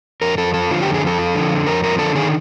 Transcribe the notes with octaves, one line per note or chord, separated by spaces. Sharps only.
F2 A#4
F2 A4
F3 A4
D3 F4
F2 G4
G#4
F2 A4
F3
D3
F2
F2 A#4
F3 A#4
D3 A4
D#3 G#4